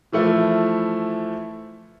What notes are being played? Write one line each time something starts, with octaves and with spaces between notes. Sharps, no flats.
E3 F3 A3 E4